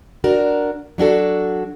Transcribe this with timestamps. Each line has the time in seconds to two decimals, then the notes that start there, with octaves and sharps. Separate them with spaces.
0.24 D4 F#4 A#4
0.98 F#3 D4 F#4 A4